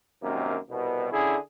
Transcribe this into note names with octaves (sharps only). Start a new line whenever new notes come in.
A#1 F#2 C3 D#3 A#3
C2 B2
D3 C#4 E4 G#4